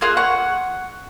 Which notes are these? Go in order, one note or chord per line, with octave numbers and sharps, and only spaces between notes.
A#3 F4 G#4 F#6
F#5 C#6